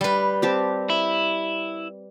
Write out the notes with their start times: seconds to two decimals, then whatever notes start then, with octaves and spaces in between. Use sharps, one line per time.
0.01 G3 B4
0.42 C4 G4 A5
0.90 E4